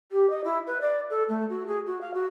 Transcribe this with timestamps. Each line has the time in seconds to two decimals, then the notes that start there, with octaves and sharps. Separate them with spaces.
0.11 G4
0.29 D#5
0.44 E4
0.66 B4
0.80 D5
1.09 A4
1.28 A3
1.49 F#4
1.66 G#4
1.86 F#4
2.01 F5
2.13 F#4